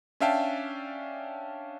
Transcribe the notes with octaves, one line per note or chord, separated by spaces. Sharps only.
C#4 D4 E5 F5 G5 A5